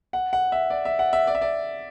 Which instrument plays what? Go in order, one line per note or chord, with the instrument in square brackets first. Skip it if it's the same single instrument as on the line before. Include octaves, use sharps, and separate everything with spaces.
[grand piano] F#5
F#5
E5
D5
E5
F#5
E5
D5
E5
D5